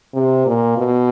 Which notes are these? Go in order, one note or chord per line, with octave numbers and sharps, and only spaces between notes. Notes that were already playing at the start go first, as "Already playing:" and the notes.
C3
A#2
B2